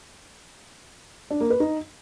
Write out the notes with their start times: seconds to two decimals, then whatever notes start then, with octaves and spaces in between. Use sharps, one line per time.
1.31 D4
1.40 A#3
1.50 B4
1.60 D#4